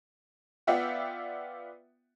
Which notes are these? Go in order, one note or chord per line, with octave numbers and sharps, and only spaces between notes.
B3 F4 D5 E5 F#5 G5